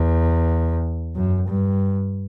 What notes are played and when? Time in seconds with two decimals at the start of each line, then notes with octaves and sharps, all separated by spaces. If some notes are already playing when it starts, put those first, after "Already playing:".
Already playing: E2
1.15 F#2
1.48 G2